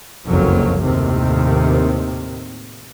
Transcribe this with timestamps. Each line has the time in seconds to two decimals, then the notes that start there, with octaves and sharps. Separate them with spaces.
0.27 F#1 C2 F2 F#3 A#3
0.81 D#2 A2 C3 D#3